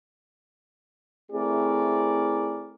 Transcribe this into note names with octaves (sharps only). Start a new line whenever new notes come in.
A3 C4 E4 G#4 A#4 D5